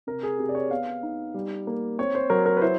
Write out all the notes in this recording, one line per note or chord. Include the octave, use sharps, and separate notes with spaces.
C3 A#4
G#4
C3 G4
D5
C#5
B3 F5
D#4
G3
A#3
C4 C#5
C5
F#3 A#4
A#4
B4
E4 C5